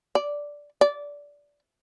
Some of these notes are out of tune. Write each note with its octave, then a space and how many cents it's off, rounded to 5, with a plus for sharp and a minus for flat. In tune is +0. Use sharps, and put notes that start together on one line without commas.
D5 -5
D5 -15